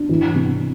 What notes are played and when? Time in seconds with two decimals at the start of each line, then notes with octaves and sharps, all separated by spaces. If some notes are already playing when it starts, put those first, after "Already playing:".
Already playing: D4
0.09 E3
0.34 C3